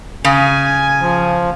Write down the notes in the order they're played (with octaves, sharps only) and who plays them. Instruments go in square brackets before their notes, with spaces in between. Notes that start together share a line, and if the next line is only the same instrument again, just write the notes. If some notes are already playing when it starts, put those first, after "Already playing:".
[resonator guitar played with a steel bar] C#3 [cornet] G#5
[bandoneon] F3